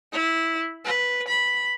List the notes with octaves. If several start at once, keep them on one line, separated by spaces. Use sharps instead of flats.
E4
B4
B5